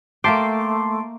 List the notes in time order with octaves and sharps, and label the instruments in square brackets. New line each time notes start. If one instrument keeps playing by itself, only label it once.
[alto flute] A3 [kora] A#3 E5 G5 [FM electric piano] A5 C6 D6